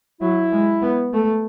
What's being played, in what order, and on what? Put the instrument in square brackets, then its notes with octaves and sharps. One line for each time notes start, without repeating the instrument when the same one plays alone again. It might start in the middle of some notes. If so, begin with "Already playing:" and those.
[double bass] F#3 [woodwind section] E4
[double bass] G#3
B3
A3